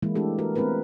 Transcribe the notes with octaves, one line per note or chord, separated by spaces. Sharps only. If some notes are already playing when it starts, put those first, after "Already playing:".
E3 G#3 A#3 E4
A3 B3 D4 G4 A4
F#4 A#4 B4
A3 B3 C4 E4 A#4 B4